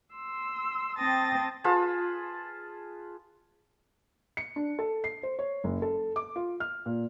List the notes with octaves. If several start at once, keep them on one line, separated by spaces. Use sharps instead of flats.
C6 E6
C4 G5 A5 D#6 A6 A#6
F4 G#4 B4 A5
C#7
D4
A4
C7
C5
C#5
F#1
A4
D6
F4
F6
A#2